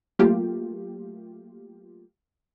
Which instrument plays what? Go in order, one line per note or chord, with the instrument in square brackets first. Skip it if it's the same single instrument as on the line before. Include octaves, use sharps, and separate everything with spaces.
[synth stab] F#3 A3 A#3 F4 G4